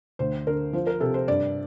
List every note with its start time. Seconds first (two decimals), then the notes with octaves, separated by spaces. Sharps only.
0.19 D2 C5
0.47 D3 A#4
0.73 F3 C5
0.87 A#4
1.00 C3 A4
1.14 C5
1.28 G2 D5